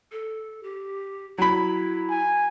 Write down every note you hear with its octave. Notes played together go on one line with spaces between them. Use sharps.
A4
G4
F#3 E4 B5
G#5